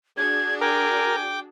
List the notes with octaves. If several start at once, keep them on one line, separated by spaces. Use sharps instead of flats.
D4 F#4 G#4 G#6
A#4 G5 G#5 D6